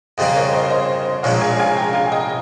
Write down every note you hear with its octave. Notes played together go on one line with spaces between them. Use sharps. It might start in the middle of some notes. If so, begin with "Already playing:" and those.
F2 C#3 G3 A#3 F4 C5 D#5
A#4 C#5
C5 D#5
C5 D#5
A#1 A#2 F3 G#3 C#4 C#5 F5
F5 G#5
F5 G#5
G5 A#5
F5 G#5
D#5 G5